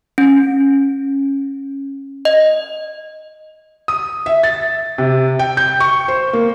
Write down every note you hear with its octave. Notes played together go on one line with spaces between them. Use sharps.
C#4
D#5
D#6
E5
A6
C3
G5
G6
C#6
C5
A#3